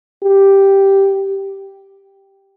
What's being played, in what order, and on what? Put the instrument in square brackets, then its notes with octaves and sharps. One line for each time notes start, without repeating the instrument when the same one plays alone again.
[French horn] G4